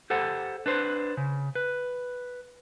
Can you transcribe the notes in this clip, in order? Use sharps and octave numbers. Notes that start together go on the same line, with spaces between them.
G4 A4 C5 F#5
D4 B4 C5
C#3
B4